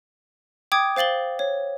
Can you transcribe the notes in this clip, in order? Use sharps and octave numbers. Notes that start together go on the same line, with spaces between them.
G5 D6 D#6 G#6
C5 F5 A6 F#7 G7
C#5